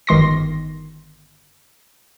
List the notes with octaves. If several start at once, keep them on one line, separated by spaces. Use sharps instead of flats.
G1 D#3 C6 A#6